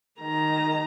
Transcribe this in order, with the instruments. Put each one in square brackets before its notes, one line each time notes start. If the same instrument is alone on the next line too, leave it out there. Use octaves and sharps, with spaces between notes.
[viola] D#3 A#5